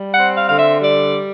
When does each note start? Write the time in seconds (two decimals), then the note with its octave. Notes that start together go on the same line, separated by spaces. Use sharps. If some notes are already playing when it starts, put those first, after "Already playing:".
Already playing: G3
0.11 F#5
0.19 C4
0.35 F5
0.47 D3 F5
0.57 E5
0.81 G3 D5